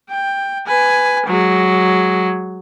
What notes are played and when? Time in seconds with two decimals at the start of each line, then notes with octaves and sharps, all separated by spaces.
0.10 G5
0.66 B4 G#5
1.26 F#3 G#3